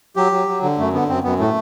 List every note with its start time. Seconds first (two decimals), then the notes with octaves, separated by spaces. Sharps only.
0.16 F#3 G4
0.32 F#3
0.48 F#3
0.63 D3
0.78 F#2 A3
0.93 D3 B3
1.09 F#2 C4
1.24 F#2 B3
1.39 A2 A3